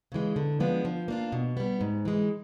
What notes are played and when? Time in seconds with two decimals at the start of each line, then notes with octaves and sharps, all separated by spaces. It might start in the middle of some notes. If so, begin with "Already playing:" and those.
0.12 C#3 E3 G#3
0.36 D3
0.60 F3 G#3 B3 D4
0.85 F3
1.08 A#3 D4 F4
1.32 B2
1.57 G3 B3
1.81 G#2
2.05 E3 G#3